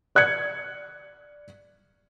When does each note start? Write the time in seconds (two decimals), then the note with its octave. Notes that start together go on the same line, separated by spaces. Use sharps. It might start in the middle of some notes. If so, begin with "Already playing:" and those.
0.15 D5 F#6 G#6 C#7